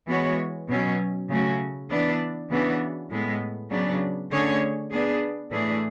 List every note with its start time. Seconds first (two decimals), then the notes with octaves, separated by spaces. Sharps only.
0.08 E3 G#3 B3 F#4 C#5
0.68 B2 F#3 C#4
1.29 C#3 F#3 A3 C#4 F#4
1.90 E3 B3 D4
2.50 C#3 E3 B3 D4 F#4
3.10 A2 G#3 B3
3.70 C#3 F#3 B3 D4
4.31 D3 A3 C#4 G#4 C#5
4.91 B3 D4 G#4
5.51 A2 E3 A3 D4 G#4